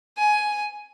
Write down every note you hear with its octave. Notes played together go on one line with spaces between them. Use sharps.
G#5